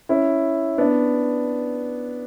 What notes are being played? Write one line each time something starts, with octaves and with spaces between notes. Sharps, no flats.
C#4 E4
B3 D4